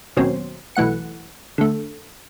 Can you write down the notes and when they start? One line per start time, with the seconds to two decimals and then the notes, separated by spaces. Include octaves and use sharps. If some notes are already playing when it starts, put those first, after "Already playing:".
0.17 D#2 B2 F#3 C4 C#4 C6
0.76 B1 E3 A3 F#5 C#7
1.58 D3 A3